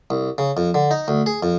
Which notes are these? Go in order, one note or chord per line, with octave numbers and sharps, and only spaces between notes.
C2
C#3
F2
D3
D#4
D2
G#4
F2